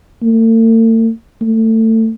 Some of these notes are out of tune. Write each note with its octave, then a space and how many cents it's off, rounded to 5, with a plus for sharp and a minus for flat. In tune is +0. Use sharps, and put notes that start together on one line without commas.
A3 +45
A3 +25